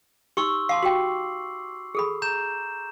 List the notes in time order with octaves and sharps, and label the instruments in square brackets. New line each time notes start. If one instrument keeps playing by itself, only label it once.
[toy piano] D#4 G4 [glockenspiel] C6 C#6 E6
[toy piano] F5 A5 C6 [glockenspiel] D6 C7
[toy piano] F#4 G4 G5 [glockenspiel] F#7
[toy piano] G#4 A4 B5
[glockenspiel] A#5 G6 E7